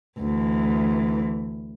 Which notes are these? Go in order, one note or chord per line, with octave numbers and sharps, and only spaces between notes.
D2 E3